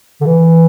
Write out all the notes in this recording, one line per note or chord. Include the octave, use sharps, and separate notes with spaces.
D3
E3